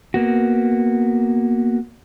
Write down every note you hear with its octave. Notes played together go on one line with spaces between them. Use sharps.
A#3 B3 F#4